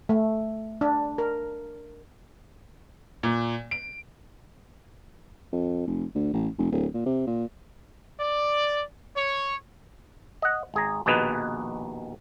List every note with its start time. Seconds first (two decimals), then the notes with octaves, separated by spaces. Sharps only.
0.09 A3
0.81 D4
1.18 A#4
3.23 A#2
3.71 D7
5.52 F2
5.87 F1
6.15 D2
6.33 A1
6.58 F1
6.72 D1
6.94 A#2
7.06 C3
7.27 A#2
8.20 D5
9.16 C#5
10.42 D#5 F#5
10.74 G#1 G#4 A#5
11.06 A#1 D#2 B2 D#4 G#4 B4